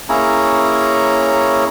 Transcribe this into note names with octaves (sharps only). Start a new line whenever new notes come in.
A#3 C#4 E4 G#4 C#5 A#5